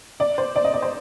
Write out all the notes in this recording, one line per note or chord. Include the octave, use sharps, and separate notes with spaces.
D5
C5
D5
D#5
D5
C5